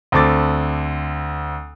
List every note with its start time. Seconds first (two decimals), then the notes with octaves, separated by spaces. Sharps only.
0.12 D2 C4 A4 D6 A6